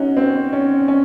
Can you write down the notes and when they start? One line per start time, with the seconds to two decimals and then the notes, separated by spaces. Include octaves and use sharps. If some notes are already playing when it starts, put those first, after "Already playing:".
Already playing: C#4 D#4 F#4
0.17 C4
0.53 C#4
0.88 C#4